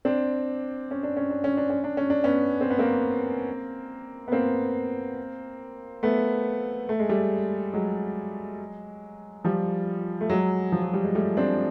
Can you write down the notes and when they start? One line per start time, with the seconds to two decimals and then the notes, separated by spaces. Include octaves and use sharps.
0.05 C4 D4
0.91 C#4
1.03 D4
1.17 C#4
1.30 D4
1.44 C#4
1.57 D4
1.70 C#4
1.84 D4
1.97 C#4
2.10 D4
2.24 B3 C#4
2.61 C4
2.70 B3
2.79 A#3 C4
4.28 B3
4.32 A#3 C4
6.03 A3 B3
6.89 A3
6.99 G#3
7.09 G3 A3
7.73 F#3 G#3
9.45 F3 G3
10.21 A3
10.29 F#3 G#3
10.72 F3
10.82 F#3
10.93 G3
11.04 G#3
11.15 G3 A3
11.37 C4 D4